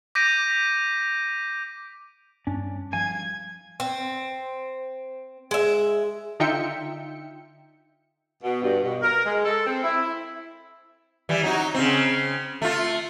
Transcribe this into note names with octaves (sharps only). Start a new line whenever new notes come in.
D6 G6 A#6 B6 D7 D#7
G2 C#4 D4
F3 G3 F5 G#5 G#6
C4
G#3 E5
D3 D#4 F4 E5 G5 C#7
B2
G2
B2
A#4
G#3
A4
C4
E4
E3 G3
F#3 D#4 F#4
C#3 C4
A3 F4